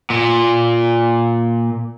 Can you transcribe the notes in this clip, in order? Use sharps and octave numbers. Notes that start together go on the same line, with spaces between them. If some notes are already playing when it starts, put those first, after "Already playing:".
A#2